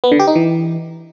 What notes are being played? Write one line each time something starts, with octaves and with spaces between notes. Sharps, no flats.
B3
D3
G4
D#4
E3